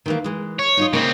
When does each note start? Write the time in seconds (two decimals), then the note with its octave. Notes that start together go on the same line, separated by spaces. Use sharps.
0.06 D#3 E3 A#3
0.24 E3 G#3
0.59 C#5
0.77 D#4 F4 D#5
0.93 C#3 A#3 C4 D#5